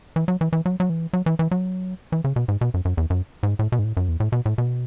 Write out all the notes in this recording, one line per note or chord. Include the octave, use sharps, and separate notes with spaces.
E3
F#3
E3
E3
F#3
F#3
E3
F#3
E3
E3
F#3
E3
C#3
B2
G#2
B2
F#2
F#2
E2
F#2
G#2
A2
B2
G#2
A2
F#2
E2
A2
B2
A2
B2